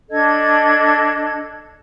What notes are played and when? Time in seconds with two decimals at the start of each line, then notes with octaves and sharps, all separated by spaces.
0.09 D4 A4 D#5 G#6